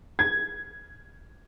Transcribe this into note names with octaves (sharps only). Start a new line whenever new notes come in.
G#6